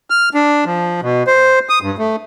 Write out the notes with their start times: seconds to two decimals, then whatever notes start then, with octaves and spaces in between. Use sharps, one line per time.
0.10 F6
0.34 D4
0.65 F3
1.02 B2
1.27 C5
1.69 D#6
1.82 G2
1.98 A3